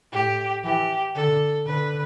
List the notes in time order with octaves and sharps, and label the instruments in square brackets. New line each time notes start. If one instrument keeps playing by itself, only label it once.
[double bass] A2 [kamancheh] G4
[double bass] E3 [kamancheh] G4
[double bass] D3 [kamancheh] A4
[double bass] D3 [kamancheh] B4